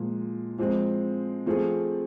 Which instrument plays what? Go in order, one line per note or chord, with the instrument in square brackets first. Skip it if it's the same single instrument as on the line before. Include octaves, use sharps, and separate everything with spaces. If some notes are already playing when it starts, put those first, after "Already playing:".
Already playing: [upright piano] A#2 F3 G#3
F3 G#3 C4
F3 A3 C4 F4 G#4